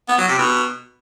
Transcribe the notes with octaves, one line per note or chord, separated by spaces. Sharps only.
B3
F#3
C3
B2